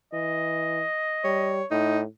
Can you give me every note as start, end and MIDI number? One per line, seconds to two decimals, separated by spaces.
0.13 0.84 52
0.13 1.57 75
1.24 1.61 55
1.24 1.66 73
1.71 2.05 45
1.71 2.00 63